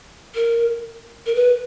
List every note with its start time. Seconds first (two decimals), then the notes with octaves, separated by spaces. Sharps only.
0.35 A#4
1.26 A#4
1.35 B4